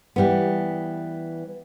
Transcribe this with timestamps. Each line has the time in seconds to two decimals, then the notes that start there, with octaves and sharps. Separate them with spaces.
0.16 E3 G3 B3